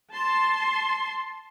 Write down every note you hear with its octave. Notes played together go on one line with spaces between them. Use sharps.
A5 C6